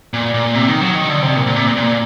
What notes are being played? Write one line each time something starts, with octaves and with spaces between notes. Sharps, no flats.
A#2
A#2
C3
D#3
F#3
D#3
D3
C3
A#2
A#2
C3
A#2
A#2